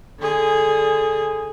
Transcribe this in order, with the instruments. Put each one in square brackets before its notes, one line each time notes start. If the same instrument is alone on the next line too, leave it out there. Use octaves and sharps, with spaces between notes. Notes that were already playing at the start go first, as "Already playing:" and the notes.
[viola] D3 G#4